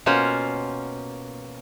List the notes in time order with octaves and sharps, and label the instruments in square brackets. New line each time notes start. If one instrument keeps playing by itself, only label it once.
[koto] B2 A#3 C#4 F4 C5 F#5